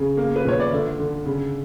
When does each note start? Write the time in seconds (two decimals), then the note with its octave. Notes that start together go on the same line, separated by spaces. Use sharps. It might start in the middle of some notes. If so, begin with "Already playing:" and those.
Already playing: C#3
0.17 A#3
0.36 B4
0.45 A#2 C#5
0.60 D5
0.72 D3 E5
0.99 D3
1.26 C#3